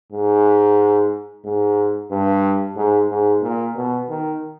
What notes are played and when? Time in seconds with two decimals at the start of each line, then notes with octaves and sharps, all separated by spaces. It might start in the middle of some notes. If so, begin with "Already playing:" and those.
0.12 G#2
1.45 G#2
2.11 G2
2.76 G#2
3.10 G#2
3.42 A#2
3.76 B2
4.09 D#3